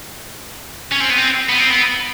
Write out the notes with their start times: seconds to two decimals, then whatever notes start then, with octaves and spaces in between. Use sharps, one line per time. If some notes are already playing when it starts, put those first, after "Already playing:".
0.92 C#4
1.00 C4
1.10 B3
1.18 C4
1.49 B3
1.59 C4
1.70 B3